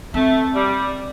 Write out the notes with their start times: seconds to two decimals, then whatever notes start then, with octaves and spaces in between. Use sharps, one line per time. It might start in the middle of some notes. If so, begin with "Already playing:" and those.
0.14 A3 C4
0.55 G3